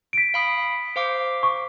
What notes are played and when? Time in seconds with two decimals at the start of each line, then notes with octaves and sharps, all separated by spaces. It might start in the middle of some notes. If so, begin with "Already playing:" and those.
0.13 B6 D7
0.34 F5 B5 D#6
0.96 C5 F5 D6
1.43 C#6